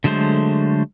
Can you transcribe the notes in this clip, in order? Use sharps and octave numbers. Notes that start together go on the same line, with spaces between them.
D3 F#3 G#3 A3 C5